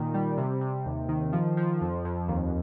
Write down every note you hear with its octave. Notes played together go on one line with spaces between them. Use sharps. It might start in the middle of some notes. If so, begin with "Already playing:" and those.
Already playing: A#2 D#3
G3
C3
C3
D#2
D#3
F3
F3
F2
F2
D#2